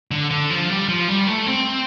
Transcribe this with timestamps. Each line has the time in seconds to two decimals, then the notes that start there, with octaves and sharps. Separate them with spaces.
0.11 D3
0.31 D3
0.50 F3
0.70 G3
0.88 F3
1.08 G3
1.27 A3
1.46 C4